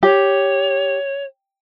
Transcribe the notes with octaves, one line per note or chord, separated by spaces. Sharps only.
G4 C#5